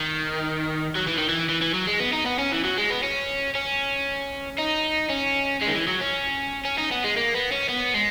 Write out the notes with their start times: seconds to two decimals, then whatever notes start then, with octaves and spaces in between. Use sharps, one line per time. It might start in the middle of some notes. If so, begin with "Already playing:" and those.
Already playing: D#3
0.97 F#3
1.08 E3
1.18 D#3
1.29 E3
1.49 E3
1.62 E3
1.74 F#3
1.87 G#3
2.00 B3
2.13 D#4
2.26 B3
2.39 C#4
2.52 E3
2.65 F#3
2.78 G#3
2.90 B3
3.03 C#4
3.55 C#4
4.59 D#4
5.10 C#4
5.62 G#3
5.68 D#3
5.75 E3
5.88 F#3
6.01 C#4
6.65 C#4
6.78 D#4
6.91 B3
7.04 G#3
7.17 A#3
7.34 B3
7.52 C#4
7.69 B3
7.94 G#3